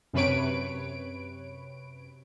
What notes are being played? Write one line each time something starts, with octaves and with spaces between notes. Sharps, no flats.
F#2 C3 B4 C#5 D7